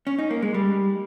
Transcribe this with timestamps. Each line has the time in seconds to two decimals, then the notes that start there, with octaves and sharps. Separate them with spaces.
0.07 C#4
0.19 D#4
0.31 A#3
0.42 G#3
0.54 G3